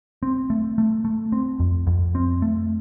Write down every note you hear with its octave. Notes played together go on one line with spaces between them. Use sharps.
C4
A3
A3
A3
C4
F2
F2
C4
A3